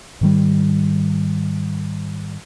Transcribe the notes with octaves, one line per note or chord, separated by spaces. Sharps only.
G#2 D#3 G3